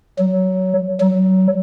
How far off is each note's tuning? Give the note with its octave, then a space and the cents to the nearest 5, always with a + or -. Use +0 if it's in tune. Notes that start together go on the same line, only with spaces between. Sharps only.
F#3 +15
F#3 +25